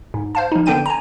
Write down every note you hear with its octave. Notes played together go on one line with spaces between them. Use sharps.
G#2
C5 F5 A5
F3 D#4
D3 B3 D4 G5 G6 D#7
G#5 A#5